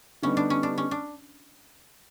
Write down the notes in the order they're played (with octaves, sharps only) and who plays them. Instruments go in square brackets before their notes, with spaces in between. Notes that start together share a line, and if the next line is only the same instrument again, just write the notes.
[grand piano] D3 G3 B3 D#4 G4 [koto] C#4
[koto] D4
C#4
D4
C#4
D4